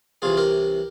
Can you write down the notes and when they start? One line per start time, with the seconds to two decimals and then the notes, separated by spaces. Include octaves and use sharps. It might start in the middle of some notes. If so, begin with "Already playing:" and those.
0.22 C2 C3 E3 F4 G#4
0.37 G4 A#4